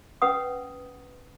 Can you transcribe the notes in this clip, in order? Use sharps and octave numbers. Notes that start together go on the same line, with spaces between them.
C#4 B4 F#5 D#6